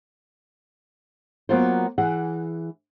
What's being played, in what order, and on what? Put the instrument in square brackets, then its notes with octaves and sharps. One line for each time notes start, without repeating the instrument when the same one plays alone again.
[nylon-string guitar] F#3 A#3 B3 F4 A#4 C5
E3 G#4 F#5